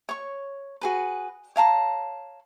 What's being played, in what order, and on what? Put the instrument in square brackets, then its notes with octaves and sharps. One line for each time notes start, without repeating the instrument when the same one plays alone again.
[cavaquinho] C#5 C#6
F#4 G#4 B4
C#5 F5 A5 A#5